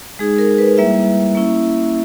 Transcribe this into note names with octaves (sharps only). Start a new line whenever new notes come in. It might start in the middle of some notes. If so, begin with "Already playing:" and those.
G#3 D#4 G#4
A#4
B4
G3 A#3 E4 E5
A#3 C#4 E4